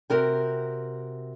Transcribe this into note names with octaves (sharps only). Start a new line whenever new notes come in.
C3 F#4 A#4 G5